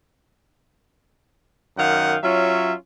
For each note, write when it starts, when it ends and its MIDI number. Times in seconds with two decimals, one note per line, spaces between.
1.77 2.16 42
1.77 2.16 51
1.77 2.16 77
1.77 2.16 78
2.22 2.72 54
2.22 2.72 61
2.22 2.72 65
2.22 2.72 76